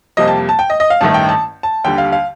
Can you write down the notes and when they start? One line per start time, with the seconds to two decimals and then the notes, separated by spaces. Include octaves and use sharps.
0.17 F2 C3 G3 A#3 D#5
0.28 A5
0.49 A5
0.59 G5
0.70 D#5
0.80 D#5
0.90 F5
1.01 A1 G2 D#3 A3 A5
1.14 G5
1.29 A5
1.63 A5
1.84 D#2 D3 G3 G5
1.98 F5
2.12 F5